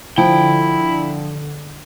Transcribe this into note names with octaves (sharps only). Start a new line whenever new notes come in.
D3 F3 E4 G5